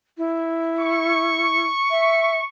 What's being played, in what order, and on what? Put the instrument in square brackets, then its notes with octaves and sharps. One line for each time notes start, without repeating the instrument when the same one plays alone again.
[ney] E4
[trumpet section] C#6
[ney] E5